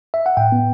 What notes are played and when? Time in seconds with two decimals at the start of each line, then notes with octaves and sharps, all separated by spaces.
0.14 E5
0.26 F#5
0.37 A2 G5
0.52 B3